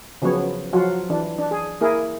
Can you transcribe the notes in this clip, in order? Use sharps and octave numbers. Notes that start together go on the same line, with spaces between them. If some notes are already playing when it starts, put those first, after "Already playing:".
C#3 F3 F#3 B3 C#5
F3 F#3 F4 F#4
E3 D4
D4
G#4
A#3 E4 G#4 A#4